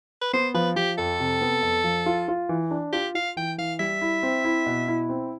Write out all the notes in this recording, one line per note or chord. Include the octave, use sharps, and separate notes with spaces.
B4
B3 C5
F3 B4
F3 G4
F2 A4
C3
B3
F2
F3
F4
F4
E3
D4
F4 G4
F4 F5
E3 G5
E3 F5
G3 E5
E4
C4
E4
B2
E4
C4